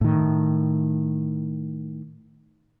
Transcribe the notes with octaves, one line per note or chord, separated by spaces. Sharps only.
A2 D#3